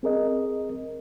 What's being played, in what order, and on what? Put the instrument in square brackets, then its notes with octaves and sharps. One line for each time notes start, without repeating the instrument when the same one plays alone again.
[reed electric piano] C4 G#4 A#4 D#5